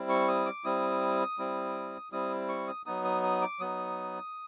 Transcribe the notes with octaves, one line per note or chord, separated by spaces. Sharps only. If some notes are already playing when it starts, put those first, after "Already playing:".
Already playing: G3 C4 E4
C#6
D#6
D6
G3 C4 E4 D#6
G3 C4 E4
G3 C4 E4 D#6
C#6
D#6
F#3 B3 D#4 D#6
D#6
D#6
D6
F#3 B3 D#4 D#6